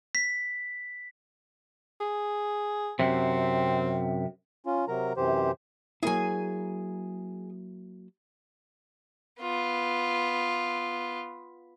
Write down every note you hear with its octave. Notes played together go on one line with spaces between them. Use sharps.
B6
G#4
F#2 C3 C4
C#4 F4
C3 F#3 A#4 A#5
F#2 C3 E3 G4 C5
F#3 A#3 E4 G#4 G#5
B3 F4